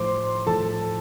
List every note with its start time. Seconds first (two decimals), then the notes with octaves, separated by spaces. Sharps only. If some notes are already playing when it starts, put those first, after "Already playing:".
Already playing: A2 F3 C5 C6 D6
0.46 A2 F3 A4 A5